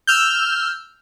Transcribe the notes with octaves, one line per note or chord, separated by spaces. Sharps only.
E6 F6 G6